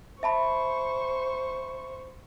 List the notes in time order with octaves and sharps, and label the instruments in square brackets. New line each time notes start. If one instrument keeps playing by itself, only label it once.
[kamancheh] C5 C#6 [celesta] E5 A5 B5